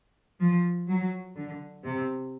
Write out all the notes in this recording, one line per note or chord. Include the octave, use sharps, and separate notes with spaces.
F3
F#3
D3
C3